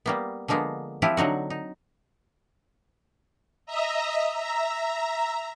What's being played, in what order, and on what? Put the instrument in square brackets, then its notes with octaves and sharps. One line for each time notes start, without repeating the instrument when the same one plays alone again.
[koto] G3 A#3 B3
D3 F3 G#3 A#3 B3
F3 C4 E4 F4 G4
D3 F#3 D#4 F#4
D#4
[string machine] D#5 E5 A#5
E5 A#5